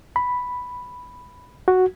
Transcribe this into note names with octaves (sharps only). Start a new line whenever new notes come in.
B5
F#4